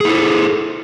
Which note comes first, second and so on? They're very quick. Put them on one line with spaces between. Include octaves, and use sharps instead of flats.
G#4 E4 A4